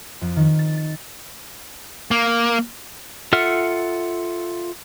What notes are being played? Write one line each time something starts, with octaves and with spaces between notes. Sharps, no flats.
F2
D#3
A6
A6
A#3
F4 A4 E5 F#5 F6